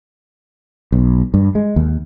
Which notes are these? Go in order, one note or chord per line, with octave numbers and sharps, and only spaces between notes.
B1
G2
G#3
D#2